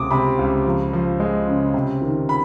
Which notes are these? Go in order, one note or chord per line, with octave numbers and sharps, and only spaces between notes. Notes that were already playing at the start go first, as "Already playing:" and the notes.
Already playing: C#2 C3 D6 D#6
C3 B5
C#2
F3
F3
G#3
C#3
C3
D#3
B5